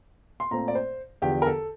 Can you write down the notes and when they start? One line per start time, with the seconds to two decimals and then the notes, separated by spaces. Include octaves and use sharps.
0.40 C6
0.51 A#2 A3 C4 A#5
0.68 D5
0.75 C5
1.22 E2 D3 F3 G4
1.42 A#4
1.46 A4